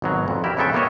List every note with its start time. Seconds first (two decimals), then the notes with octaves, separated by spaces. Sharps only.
0.02 G#1 B2 F#3
0.28 F2
0.44 E4 G4 A#4
0.57 F2 C#3 B3 A4 E5 G5
0.73 A#3 B3 E4 C#5 D#5